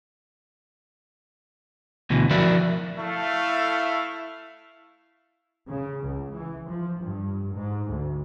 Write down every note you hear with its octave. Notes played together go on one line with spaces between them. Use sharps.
D2 B2 E3
F3 E4 F#4 A#4 D5
A3 E4 F5
C#3
C#2
E3
F3
G2
G#2
D2